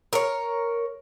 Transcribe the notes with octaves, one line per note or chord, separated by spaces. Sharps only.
A#4 C#5